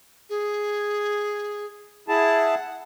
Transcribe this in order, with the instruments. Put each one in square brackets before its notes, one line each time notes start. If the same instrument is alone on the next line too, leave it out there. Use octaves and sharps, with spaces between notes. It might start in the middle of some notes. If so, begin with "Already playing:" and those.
[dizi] G#4
[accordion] E4 G#4 A5 [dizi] F#5